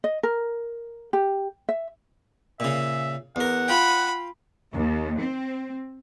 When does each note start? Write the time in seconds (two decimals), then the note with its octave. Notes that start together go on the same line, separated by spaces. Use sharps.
0.04 D#5
0.23 A#4
1.13 G4
1.69 E5
2.60 A#2 C#3 E5
3.36 E2 A#4 F#5
3.68 F4 G5 B5
4.73 D#2
5.21 C4